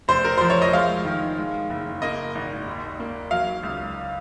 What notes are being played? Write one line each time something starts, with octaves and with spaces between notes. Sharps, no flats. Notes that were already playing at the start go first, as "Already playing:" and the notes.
F1 C5
A#4
F3 C5
C#5
D#5
G#3 F5
D#3
G#3
F#1
A#3 D#5
G#1
D#2
A#3
F#3 F5
C#2